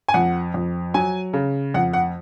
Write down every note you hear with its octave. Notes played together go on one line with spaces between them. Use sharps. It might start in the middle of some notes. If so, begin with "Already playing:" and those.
G#5
F2 F#5
F2
F#3 G#5
C#3
F2 F#5
F#5